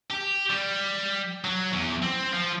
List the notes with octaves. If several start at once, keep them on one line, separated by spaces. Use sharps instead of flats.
G4
G3
F#3
E2
C4
F3